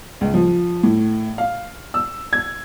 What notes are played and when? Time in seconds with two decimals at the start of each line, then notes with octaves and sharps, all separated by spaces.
0.21 C#2
0.34 F3
0.83 A2
1.38 F5
1.94 E6
2.33 G#6